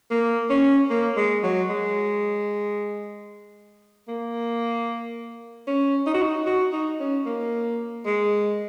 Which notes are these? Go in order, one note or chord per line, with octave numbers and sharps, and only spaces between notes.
A#3
C#4
A#3
G#3
F#3
G#3
A#3
C#4
D#4
F#4
D#4
F#4
D#4
C#4
A#3
G#3